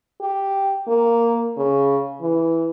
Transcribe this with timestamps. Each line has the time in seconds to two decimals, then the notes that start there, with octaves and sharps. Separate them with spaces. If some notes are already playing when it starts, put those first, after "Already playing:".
0.21 G4
0.88 A#3
1.57 C#3
2.22 E3